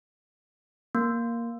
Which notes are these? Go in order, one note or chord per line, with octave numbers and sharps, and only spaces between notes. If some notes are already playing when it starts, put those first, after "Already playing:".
A#3